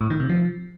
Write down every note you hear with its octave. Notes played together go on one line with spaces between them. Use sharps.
A2
D#3
C3
F3